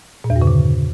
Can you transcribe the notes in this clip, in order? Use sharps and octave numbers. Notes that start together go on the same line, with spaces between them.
A#2
E2
G2
C#3
D3